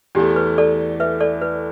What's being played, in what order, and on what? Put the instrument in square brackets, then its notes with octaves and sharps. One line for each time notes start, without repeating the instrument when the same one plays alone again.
[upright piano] E2 E3 A3 [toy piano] G4
[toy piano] B4
A4 D5
B4 E5
A4 D5
B4